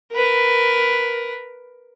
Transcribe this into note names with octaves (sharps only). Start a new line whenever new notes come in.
A#4 B4